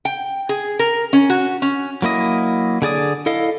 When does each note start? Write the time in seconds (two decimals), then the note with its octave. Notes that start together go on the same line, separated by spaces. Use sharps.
0.05 G5
0.49 G#4
0.79 A#4
1.13 C#4
1.30 F#4
1.62 C#4
2.02 F#3 A#3 E4 D#5
2.82 D3 G#4 D5 D#6
3.26 E4 A4 D#5 F5